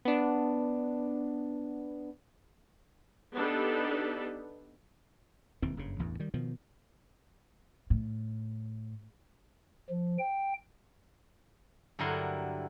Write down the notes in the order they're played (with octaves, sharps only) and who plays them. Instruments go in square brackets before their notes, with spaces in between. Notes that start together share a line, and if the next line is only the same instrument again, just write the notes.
[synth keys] B3 D4
[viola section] B3 D4 D#4 G4 A4 B4
[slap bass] E1 D#2 E3 C4
F#1 G2 C#3
A1 E2 G2
D#3 G3
B2 D#3 F3
[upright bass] A2
[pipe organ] F3
G5
[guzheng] G2 D3 F#3 E4 A#4 C6